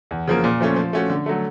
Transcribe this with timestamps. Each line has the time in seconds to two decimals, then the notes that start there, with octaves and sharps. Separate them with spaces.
0.11 E2
0.28 C#3 F3 A#3
0.44 A#2
0.61 F3 A3 C#4
0.76 F3
0.93 A3 C#4 F#4
1.10 D3
1.26 F#3 A3